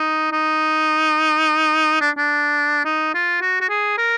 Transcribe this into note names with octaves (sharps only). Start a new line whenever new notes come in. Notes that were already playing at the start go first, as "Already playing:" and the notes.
Already playing: D#4
D#4
D4
D4
D#4
F4
F#4
F#4
G#4
A#4